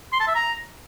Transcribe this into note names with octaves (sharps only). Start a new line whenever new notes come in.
C6
A5
E5
A#5